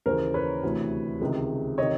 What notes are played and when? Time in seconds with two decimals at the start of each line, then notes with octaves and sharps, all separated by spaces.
0.06 D#2 C#3 E3 A#4 C5
0.34 B4 C#5
0.63 D2 C3 E3
1.21 C#2 C3 D#3 G#3
1.78 C3 D#3 C#5 D#5